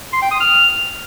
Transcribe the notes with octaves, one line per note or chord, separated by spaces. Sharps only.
C6
G5
D#6
F6